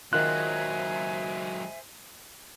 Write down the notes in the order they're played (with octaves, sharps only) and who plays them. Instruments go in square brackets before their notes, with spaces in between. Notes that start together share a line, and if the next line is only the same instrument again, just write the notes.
[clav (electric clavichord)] D#3 F4 [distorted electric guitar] F#3 G#3 [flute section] C5 E5 G#5 [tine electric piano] F#6